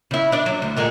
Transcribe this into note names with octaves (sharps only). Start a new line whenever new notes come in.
C#3 E4
D4 D5
F#3
D2
A#2 D3 G#3